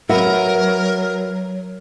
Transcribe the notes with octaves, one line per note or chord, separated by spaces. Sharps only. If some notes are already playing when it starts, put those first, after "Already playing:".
F#3 F#4 A#4 B4 E5